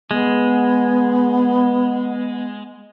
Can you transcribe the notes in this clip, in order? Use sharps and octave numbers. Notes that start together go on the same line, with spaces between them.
G#3 B3